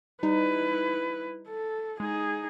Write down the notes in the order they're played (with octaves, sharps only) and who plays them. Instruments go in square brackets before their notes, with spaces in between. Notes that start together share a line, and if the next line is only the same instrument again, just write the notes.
[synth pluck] G3 D#4 [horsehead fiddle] E4 B4
[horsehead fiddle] A4
[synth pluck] G#3 [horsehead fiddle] D#4 G#4